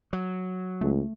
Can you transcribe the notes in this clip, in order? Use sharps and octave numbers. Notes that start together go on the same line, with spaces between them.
F#3
C#2 A3